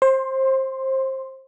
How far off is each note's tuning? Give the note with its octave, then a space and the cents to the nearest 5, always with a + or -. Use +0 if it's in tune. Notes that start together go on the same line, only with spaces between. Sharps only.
C5 +25 C6 +0